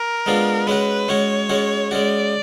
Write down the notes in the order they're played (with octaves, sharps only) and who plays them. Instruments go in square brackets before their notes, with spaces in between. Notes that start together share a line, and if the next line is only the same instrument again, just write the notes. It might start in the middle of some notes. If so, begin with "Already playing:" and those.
Already playing: [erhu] A#4
[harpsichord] G#3 B3 D4 F4
[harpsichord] G#3 C#4 F#4 [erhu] B4
[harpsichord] G#3 C#4 F#4 [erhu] C#5
[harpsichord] G#3 C#4 F#4
[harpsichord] G#3 C#4 F#4 [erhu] D5